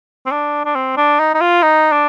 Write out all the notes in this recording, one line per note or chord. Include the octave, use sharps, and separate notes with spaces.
C4
D4
D4
C4
D4
D#4
D#4
F4
D#4
D4